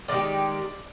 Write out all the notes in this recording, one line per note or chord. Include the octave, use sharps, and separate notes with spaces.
D#3 G#3 D#4 G4 D5